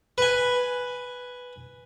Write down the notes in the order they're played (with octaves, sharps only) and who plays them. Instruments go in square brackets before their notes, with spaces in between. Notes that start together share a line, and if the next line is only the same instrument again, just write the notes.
[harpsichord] B4 G#5